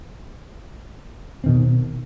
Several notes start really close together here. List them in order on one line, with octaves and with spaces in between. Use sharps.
C4 D#3 B2